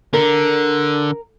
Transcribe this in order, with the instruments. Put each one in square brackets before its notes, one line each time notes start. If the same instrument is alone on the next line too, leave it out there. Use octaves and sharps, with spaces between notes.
[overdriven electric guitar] D3 [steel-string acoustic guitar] A#4